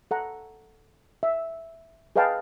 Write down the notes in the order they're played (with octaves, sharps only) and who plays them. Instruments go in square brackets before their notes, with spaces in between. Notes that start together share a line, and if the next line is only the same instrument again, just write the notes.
[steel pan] A4 F#5 A#5
E5
G#4 B4 D#5 F5 G5 A5